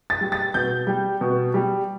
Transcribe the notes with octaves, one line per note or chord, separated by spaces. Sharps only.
A6
G3
A6
B2 G6
G3
B2
G3